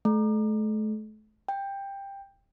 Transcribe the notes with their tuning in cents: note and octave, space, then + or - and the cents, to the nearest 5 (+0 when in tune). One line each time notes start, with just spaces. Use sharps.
A3 -35
G5 +15